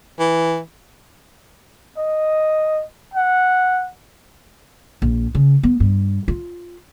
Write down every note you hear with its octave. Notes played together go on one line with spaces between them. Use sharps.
E3
D#5
F#5
A#1
C#3
B3
G2
F4